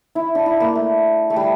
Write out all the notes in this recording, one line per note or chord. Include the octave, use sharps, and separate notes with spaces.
E4
D4
E4
A#3
A3
A3
G3